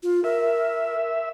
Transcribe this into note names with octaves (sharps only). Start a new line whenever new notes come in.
F4
A#4 E5